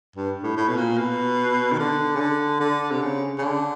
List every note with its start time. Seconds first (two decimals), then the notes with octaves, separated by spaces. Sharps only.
0.16 G2
0.43 A2
0.57 A2
0.68 B2
0.77 A#2
0.98 B2
1.73 D#3
1.79 D3
2.16 C#3
2.20 D3
2.60 D3
2.91 C3
3.02 C#3
3.38 C#3
3.42 D3